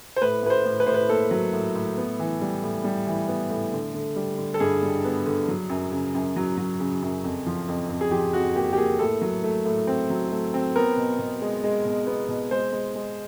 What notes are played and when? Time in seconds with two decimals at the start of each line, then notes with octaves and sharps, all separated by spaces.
0.16 C5
0.22 A2 B4
0.43 A2 B4
0.50 C5
0.66 A2
0.80 B4
0.87 A2 C5
0.94 B4
1.09 A#3 A4
1.31 F#3
1.53 A2
1.75 A2
1.97 B3
2.19 E3
2.41 G3
2.63 A2
2.84 G3
3.07 E3
3.28 B3
3.50 A2
3.73 D3
3.94 D3
4.16 G3
4.38 D3
4.54 A4
4.60 G2 G#4
4.82 G3
5.05 B3
5.26 D3
5.48 F#3
5.70 F#2
5.92 C#3
6.15 F#2
6.36 F#3
6.58 F#3
6.80 C#3
7.03 F#2
7.24 F2
7.46 F3
7.68 F2
7.89 F2
8.01 G#4
8.11 F3 G4
8.33 F2 F#4
8.56 A#3 G4
8.73 G4
8.78 A#3 G#4
8.99 A2 A4
9.22 F#3
9.44 A3
9.65 A2
9.87 C4
10.10 F#3
10.32 A3
10.54 C4
10.75 B3 A#4
10.97 B2
11.19 B2
11.41 G#3
11.64 G#3
11.85 B2
12.07 B3
12.29 B2
12.51 G#3 C5
12.72 G#3
12.95 G#3